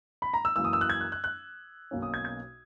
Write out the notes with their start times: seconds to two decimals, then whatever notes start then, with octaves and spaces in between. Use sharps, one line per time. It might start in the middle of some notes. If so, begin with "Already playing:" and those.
0.22 B5
0.34 A#5
0.45 E6
0.56 F#2 E3 A#3 E6
0.64 D#6
0.73 E6
0.81 F#6
0.90 G#6
1.01 F#6
1.12 F#6
1.24 F#6
1.91 B1 B2 A#3 C#4
2.02 D#6
2.14 G#6
2.25 G#6